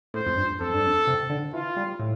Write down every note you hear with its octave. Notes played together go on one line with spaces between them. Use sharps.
A2 C5
F2
G2
F2 A4
G2
F2
C3
D3
E3 F4
G3
A2